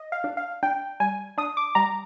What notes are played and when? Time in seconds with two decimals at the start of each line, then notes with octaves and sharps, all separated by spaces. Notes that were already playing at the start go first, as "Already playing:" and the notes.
Already playing: D#5
0.12 F5
0.24 D4
0.37 F5
0.63 D4 G5
1.00 G3 G#5
1.38 D4 D#6
1.57 D6
1.75 G3 A#5